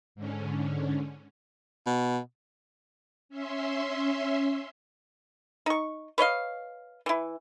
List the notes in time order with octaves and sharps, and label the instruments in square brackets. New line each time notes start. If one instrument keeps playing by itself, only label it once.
[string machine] G#2 D3 C#4
[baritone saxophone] B2
[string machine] C#4 E5 C6
[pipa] D#4 C#6
B4 C#5 D#5 F5
E3 E4